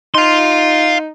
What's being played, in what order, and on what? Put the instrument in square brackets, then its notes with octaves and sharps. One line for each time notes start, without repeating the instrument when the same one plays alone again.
[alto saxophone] D#4 [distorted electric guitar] F5 C6